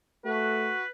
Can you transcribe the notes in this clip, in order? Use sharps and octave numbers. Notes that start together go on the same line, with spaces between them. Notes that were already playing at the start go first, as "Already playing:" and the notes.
A3 F#4 B4